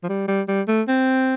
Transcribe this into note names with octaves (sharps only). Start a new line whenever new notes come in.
F3
G3
G3
G3
A3
C4